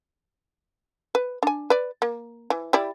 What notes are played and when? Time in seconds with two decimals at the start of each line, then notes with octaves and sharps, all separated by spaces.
1.15 B4
1.43 D4 G#5
1.70 B4 D5
2.02 A#3
2.50 E3
2.73 G3 E4 D5